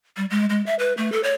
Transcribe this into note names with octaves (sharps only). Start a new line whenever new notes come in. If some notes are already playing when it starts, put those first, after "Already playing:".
G3
G#3
G#3
E5
B4
A3
A4
C#5